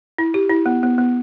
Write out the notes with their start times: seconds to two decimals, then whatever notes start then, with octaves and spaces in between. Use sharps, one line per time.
0.18 E4
0.34 G4
0.50 E4
0.66 B3
0.83 B3
0.98 B3